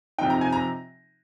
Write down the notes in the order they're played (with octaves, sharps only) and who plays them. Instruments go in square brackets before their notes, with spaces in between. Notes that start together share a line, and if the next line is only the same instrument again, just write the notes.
[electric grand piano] C3 F3 C4 D#4 [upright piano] G5
[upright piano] A#5
G#5
A#5